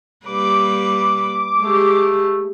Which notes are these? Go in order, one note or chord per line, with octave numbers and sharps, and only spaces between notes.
G3 A#3 B4 D6
G#3 A3 G4